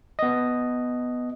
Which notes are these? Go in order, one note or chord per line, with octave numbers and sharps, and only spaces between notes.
B3 D#5